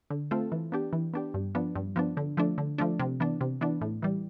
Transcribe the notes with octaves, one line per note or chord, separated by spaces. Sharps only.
D3
A3 C4 F4 A4
E3
B3 D4 G4
E3
B3 D4 G4
G2
F3 B3 D4
G2
F3 B3 D4
D3
F3 A3 D4
D3
F3 A3 D4
C3
E3 B3 D4
C3
E3 B3 D4
A2
E3 G3